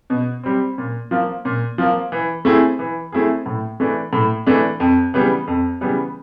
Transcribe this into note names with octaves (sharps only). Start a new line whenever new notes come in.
B2
G3 C4
A#2
F3 A#3
A#2
F3 A#3
E3
A3 C4 E4 G#4
E3
A3 C4 E4 G#4
A2
E3 A3 D4
A2
E3 A3 D4
F2
C#3 E3 G3 B3
F2
C#3 E3 G3 B3